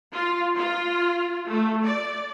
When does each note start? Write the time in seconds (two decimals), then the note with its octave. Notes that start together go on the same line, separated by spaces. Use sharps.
0.13 F4
0.57 F4
1.48 A3
1.84 D5